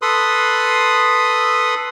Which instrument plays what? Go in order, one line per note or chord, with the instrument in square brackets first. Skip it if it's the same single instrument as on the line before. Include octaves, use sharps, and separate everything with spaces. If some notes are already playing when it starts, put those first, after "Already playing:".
[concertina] A4 B4 B5 C6 D#6